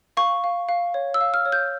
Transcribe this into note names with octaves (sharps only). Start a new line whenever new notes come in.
F5 C#6
F5
F5
C#5
E6
F5
F6
C#5
G6